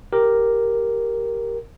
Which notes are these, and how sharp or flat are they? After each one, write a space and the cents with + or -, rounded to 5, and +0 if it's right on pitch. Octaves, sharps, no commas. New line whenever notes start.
G4 +0 A#4 +0